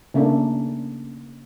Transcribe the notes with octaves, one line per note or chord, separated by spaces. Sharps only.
C#3 A3 A#3 C#4 D4